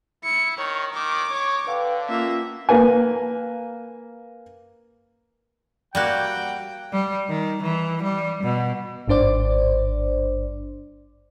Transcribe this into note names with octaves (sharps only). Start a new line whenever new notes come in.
E4 C#7
D#3 C#5
D#3 D6
C#5
D3 B4 F5 G5
A#3 C#4 F4 E5
A#3 B4 G#5
G3 A#3 F#4 F#5 G5
G3
D#3
E3
G3
B2
G#1 G2 D4 C5 D5